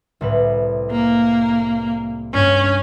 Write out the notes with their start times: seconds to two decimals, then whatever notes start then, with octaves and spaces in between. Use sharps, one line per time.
0.21 C2 A2 B4
0.91 A#3
2.34 G2 C#4